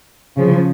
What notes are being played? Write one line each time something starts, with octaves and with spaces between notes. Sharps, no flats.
C#3 F3